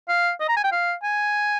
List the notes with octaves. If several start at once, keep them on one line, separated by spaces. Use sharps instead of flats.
F5
D#5
A#5
G#5
G5
F5
G#5